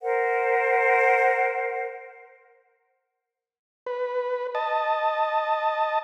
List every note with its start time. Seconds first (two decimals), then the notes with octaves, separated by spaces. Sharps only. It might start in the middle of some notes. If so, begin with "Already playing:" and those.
0.01 A#4 C5 F#5
3.87 B4
4.55 D#5 A5